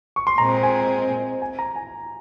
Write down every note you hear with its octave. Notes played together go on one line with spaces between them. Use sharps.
C#6
C6
A#2 G#3 C4 A#5
G#5
G#5
A#5
G#5